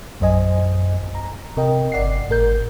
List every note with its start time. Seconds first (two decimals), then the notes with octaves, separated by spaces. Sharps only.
0.20 A#1 F#2 C5 D#5 G#5
1.15 A#5
1.57 C3 A#4 D#5 G5
1.92 G1 D5 F#5 C7
2.28 G#1 A2 A#4 G6